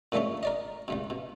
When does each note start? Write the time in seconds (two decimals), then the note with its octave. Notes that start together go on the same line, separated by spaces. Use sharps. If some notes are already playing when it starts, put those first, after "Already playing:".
0.12 A#2 D3 G#3 A3 C#4
0.43 A#4 D5 D#5
0.88 C#2 G2 B2
1.10 B2